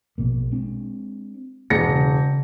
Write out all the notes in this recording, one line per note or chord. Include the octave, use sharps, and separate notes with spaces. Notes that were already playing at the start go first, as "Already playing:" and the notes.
A#1 B2 A#3
G#3 C4 D4
E1 A#3 A#6 C#7
C#3